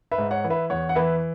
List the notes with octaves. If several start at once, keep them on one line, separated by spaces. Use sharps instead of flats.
B4 E5
G#2
C#5 F#5
E3
B4 E5
E2 C#5 F#5
F#5
E3 B4 E5